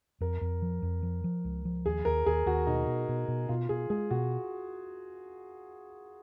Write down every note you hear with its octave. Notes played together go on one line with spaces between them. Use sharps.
F2 A#4
F2
F3
F2
F3
F3
C#2
F3
D#2 G#4
D#2 A#4
D#2 G#4
D#2 F#4
B2 D#4
B2
B2
B2
B2 F4
B2 G#4
G#3 G#4
B2 F#4